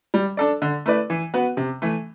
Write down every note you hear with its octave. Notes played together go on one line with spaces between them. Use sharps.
G3
D4 A4 D5
D3
A3 E4 B4 D5
E3
B3 F#4 B4
C3
E3 A3